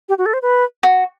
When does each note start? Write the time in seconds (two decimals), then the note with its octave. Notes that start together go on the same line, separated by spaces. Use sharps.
0.09 G4
0.18 F#4
0.26 A4
0.33 C5
0.42 B4
0.83 F#4